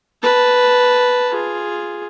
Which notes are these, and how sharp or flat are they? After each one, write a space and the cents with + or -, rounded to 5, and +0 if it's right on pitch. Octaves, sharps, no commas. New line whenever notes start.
B4 +0 A5 +0
F4 +0 G#4 +0